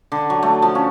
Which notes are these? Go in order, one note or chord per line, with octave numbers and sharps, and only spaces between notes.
D3
F#3
A3
F3
C#4